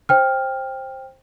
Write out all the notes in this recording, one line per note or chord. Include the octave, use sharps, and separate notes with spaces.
C5 G5 F6